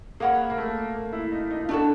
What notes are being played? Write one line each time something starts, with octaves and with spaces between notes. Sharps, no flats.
A#3 G#4 C#5 F#5 B5
A#3
A3
A#3
E4
D#4
D#4
F4
D4 E4 F#4 A4